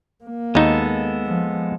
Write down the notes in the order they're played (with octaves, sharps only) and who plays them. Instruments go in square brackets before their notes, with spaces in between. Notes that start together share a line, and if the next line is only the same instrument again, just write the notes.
[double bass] A#3
[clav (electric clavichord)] D#2 D#4 [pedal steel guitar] G#3 B3 A4
[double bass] F3